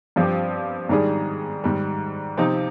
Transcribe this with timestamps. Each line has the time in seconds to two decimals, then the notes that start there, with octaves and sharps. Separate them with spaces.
0.16 G2 F3 C4 G4
0.89 G#2 D#3 G3 D4 G#4
1.64 G#2 D#3 G3
2.37 C3 F3 C4 D#4